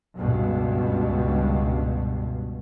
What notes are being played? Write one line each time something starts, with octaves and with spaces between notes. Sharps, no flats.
C#2 G2 B2